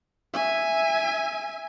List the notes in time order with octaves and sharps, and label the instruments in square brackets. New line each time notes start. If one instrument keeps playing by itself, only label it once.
[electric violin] E5 G#5